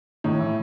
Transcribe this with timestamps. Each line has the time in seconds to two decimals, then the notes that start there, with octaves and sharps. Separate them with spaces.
0.24 A2 D#3
0.40 E3